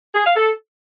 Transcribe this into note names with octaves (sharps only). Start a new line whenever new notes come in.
G#4
F5
A4